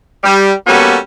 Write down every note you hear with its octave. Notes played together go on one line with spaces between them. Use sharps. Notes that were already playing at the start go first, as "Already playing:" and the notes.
G3
G3 A#3 B3 C#4 F#4 A4